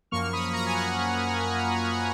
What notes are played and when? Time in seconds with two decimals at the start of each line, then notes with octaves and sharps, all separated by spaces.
0.11 F#2 F3 A#3 C#6 F6
0.33 B5 D#6
0.54 A#5 C#6
0.66 G#5
0.75 F#5 A#5
1.96 F#5